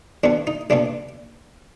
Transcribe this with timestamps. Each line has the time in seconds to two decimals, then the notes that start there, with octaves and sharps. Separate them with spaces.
0.24 B1 B2 B3 D4
0.47 D#4
0.70 B1 B2 B3 D4